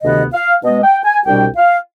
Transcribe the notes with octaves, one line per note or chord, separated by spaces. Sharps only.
D2 C3 D#3 B3 D#5
F5
B2 G#3 B3 D#5
G5
G#5
C2 B2 G3 D4 G5
F5